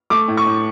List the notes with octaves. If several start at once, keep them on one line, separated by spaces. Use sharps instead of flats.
A3 D6
A2
C#6
A2